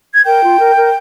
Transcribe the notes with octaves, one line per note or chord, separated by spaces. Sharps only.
G#6
A#4 G5 G6
F4
A#4
A#4